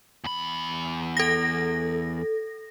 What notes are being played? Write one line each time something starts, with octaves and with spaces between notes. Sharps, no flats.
E2 B5
A4 A#6